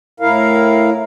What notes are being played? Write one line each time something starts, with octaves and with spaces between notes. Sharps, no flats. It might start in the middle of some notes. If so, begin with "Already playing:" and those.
A2 E4 A#4 F5